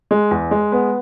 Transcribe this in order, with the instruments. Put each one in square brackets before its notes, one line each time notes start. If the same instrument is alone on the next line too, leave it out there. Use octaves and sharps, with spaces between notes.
[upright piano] G#3
E2
G#3
B3